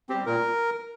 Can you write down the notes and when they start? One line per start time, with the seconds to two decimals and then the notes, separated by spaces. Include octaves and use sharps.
0.09 G3 C4 G4
0.26 A#2 A#4